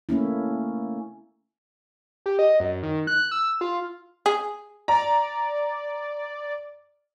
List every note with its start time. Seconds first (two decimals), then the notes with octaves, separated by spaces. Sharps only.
0.09 A3 A#3 C#4 E4
2.26 G4
2.39 D#5
2.60 F#2
2.83 D#3
3.07 F#6
3.31 E6
3.61 F4
4.26 G#4
4.88 D5 A#5